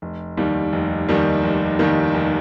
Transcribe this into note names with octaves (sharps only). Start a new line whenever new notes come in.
F1
D#2 D#3 G3
F1
D#2 D#3 G3
F1
D#2 D#3 G3
F1